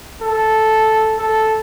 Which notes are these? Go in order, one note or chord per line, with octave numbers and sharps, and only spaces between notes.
A4
A4